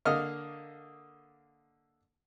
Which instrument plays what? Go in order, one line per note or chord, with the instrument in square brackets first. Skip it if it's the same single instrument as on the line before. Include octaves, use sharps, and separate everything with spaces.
[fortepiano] D3 A#3 D#5 F6